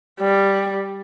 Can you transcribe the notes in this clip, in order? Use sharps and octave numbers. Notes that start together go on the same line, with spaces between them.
G3